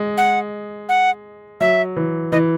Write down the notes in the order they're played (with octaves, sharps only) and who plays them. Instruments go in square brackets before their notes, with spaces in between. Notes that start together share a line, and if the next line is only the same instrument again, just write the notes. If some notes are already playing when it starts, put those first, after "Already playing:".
Already playing: [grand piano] G#3
[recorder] F#5
F#5
[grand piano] F#3 [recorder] E5
[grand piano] E3
[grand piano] E3 [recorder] D#5